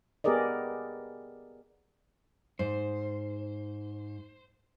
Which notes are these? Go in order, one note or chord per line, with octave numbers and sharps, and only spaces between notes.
B3 G4 G#4 A#4 D5 D#5
G#2 C5